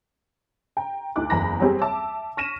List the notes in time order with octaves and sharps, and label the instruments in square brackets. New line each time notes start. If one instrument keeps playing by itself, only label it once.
[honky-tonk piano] G5 A#5
D2 D#4 E4 D6 F#6
F#1 E2 A#5 B5 A#6
F#3 G3 C4 G4 G#4
E5 A5 D6 E6
C#6 F6 A#6 B6 D#7 E7